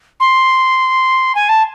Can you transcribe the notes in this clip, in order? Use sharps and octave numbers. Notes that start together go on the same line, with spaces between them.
C6
G#5
A5